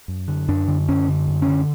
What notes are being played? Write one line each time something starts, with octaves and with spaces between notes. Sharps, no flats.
F#2
D3
F#2 D4
D3
F#2 C#4
D3
F#2
C#4
D3